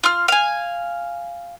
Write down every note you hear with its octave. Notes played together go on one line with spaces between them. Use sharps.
F4 F6
F5 G#5